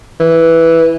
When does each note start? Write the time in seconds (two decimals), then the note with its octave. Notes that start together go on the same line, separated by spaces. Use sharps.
0.20 E3